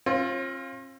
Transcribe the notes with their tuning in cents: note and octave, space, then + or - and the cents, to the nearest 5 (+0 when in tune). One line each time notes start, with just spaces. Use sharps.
C4 +45 F4 +0